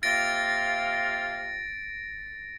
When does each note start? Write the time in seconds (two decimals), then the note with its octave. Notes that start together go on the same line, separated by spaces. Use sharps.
0.03 C3 A#3 F4 A6 A#6 D7